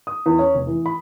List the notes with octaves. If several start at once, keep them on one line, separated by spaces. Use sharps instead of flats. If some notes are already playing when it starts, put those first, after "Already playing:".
D#6
E2
C#4
F1
E3
B5